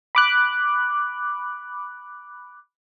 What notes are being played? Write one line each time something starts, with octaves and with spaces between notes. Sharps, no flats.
B5 D6 F#6